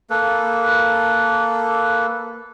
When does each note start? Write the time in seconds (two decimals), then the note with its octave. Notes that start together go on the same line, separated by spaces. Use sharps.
0.10 A#3 A4 B4